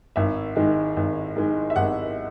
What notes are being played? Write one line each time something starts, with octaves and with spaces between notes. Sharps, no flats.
G#1 E5
G#2 D#3 G#3
G#1
G#2 D#3 G#3
E5
G#1 F#5